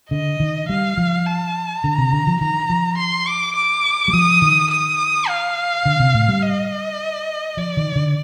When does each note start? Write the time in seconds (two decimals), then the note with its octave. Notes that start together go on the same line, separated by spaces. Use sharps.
0.11 D3 D#5
0.40 D#3
0.69 G3 F5
0.97 F3
1.26 A5
1.83 D3 A#5
1.98 C3
2.13 D3
2.27 F3
2.41 D#3 A#5
2.70 F3
2.98 C6
3.27 D6
3.56 D6
4.08 G3
4.13 F3 D#6
4.42 D#3
4.71 D#6
5.28 F5
5.85 D3
6.00 C3
6.14 A2
6.28 G3
6.43 D#5
7.57 F3 D5
7.77 D#3
7.96 D3